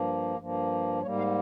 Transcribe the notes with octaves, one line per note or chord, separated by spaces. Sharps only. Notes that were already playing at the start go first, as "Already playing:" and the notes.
Already playing: G2 F3 A#3
G2 F3 A#3
G#2 G3 A#3 C#5
F5